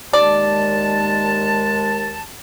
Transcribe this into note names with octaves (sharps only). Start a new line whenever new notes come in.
D#2 G#3 D5 A5